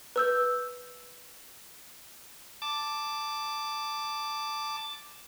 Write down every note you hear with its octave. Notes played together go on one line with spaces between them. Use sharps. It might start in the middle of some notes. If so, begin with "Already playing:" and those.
B4 E6 G6
A5 D6